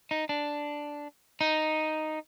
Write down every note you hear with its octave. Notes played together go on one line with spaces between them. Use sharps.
D#4
D4
D#4